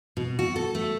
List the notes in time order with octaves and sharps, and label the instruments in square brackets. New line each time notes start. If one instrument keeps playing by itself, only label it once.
[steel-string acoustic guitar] B2
F#4
A4
A3